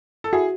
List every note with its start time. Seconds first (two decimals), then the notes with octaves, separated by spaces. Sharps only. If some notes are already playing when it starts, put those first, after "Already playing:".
0.24 A4
0.33 E4 F#4 G#4